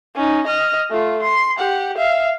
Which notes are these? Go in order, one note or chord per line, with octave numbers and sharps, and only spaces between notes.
C#4 D#4
D#5 F6
A3 F4
C6
G4 F#5
E5 F5